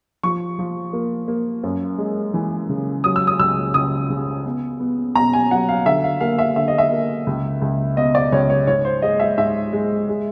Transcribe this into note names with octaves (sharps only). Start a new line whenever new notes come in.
F3 C#6
F3
A#3
A#3
F#2
G#3
E3
C#3
F#3 D#6
E6
D#6
C#2 E6
C#2 D#6
C#3
B3
B3
B2 A#5
G#5
F#3 F#5
F5
D3 E5
F5
A#3 F5
E5
D3 E5
D#5
E5
A#3
C#2
C#2
B2 D#5
D5
C#2 C#5
C#5
G#2 C#5
C5
G#3 D#5
E5
G#2 E5
G#3
G#3